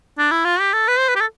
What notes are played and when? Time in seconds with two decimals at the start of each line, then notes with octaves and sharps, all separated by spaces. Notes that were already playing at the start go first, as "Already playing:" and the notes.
0.18 D4
0.31 E4
0.45 F4
0.60 G4
0.74 A4
0.88 B4
0.98 C5
1.09 B4
1.16 G4
1.21 A4